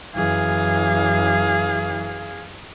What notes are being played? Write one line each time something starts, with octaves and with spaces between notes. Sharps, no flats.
F#2 E3 G#4 F5